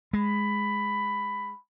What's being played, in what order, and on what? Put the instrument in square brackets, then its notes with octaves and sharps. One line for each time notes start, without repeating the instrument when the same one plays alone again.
[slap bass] G#3 [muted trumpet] B5